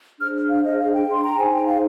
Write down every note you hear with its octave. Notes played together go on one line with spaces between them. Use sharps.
D4 G#4 C5 F6
F5
D#5
F5
G5
C6
A#5
D#4 G#4 C5 G#5
G5
F5